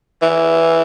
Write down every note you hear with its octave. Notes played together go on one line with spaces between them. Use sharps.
E3